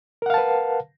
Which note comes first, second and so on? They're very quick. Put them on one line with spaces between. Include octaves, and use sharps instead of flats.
A#4 F#5 F5 A5 B4